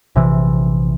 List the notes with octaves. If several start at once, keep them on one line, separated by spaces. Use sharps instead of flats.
A#1 C3 E3